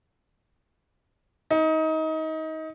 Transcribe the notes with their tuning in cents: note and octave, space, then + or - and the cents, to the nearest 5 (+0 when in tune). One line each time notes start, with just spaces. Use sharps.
D#4 +25